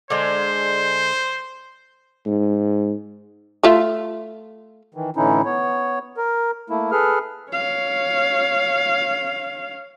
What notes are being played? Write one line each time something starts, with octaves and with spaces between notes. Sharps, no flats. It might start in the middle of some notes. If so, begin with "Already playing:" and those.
D3 G#3 C5
G#2
A3 F4 E5
D#3 E3
A2 D3 E3 C#4 D#4 E4
B3 C#5
A#4
A3 A#3 E4
G#4 A4 B4 F6
C#5 F5